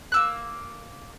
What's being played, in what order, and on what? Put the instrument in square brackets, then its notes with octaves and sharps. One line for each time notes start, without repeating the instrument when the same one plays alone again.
[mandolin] A#3 E6 F#6